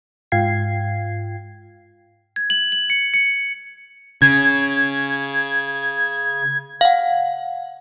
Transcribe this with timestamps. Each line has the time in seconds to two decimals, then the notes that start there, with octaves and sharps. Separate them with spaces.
0.32 G#2 F4 F5 G5 G#6 C7
2.36 G#6
2.50 F#7
2.72 F#7
2.90 C#7
3.14 C#7
4.22 C#3 G#6
6.81 F5 F#5